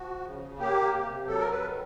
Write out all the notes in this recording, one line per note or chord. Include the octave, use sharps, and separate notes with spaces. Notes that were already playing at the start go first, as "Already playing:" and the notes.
Already playing: F3 F#4
C#3
A#3 G4
C3
F#3 A4
A#4
B4
D#3